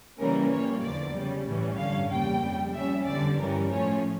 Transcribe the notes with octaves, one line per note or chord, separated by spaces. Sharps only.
C#3 E3 G3 A#3 C#4 A#4
A#2 G3 A#3 C#5
E2 D3 F3 D5
C#3 G3 C#4
A2 E3 G3 C#4
G2 D3 G3 C#4 F5
E2 C#3 G3 A#3 G5
F2 C#3 G3
A#2 G3 C#4 E5
E2 D3 G3 D5
G2 E3 G3 C#4 A#4
A2 F3 A3 C#4 C#5